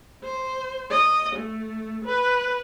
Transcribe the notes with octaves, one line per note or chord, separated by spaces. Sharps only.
C5
D#5
A3
B4